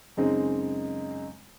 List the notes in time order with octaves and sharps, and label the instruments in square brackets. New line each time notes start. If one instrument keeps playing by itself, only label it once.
[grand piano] F#2 C#3 G#3 C4 D#4